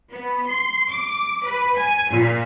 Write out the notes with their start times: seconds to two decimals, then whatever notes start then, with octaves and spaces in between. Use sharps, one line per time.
0.12 B3
0.47 C6
0.89 D6
1.43 B4
1.75 G#5
2.10 A#2